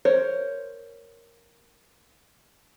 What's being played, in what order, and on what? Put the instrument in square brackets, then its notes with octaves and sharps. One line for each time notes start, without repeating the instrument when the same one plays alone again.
[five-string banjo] A#4 C5 C#5